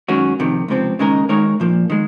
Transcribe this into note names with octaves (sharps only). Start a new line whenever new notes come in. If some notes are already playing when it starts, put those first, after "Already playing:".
F#2 D#3 G#3 C#4 F#4
F2 C3 D#3
C#2 C3 F3 C4
D#2 C#3 G#3 D#4 A#4
D#3 G#3 D#4 A#4 C#5
A#2 F3 A#3
D#3 G#3